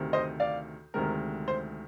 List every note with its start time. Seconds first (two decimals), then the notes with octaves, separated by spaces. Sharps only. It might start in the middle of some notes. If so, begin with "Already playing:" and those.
Already playing: D2 C3 D#3
0.13 C5 D#5
0.40 D5 F5
0.94 D2 C3 D#3 G#3 A#4
1.48 C5